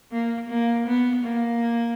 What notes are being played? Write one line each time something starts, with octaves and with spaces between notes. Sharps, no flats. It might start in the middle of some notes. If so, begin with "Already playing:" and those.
A#3
A#3
B3
A#3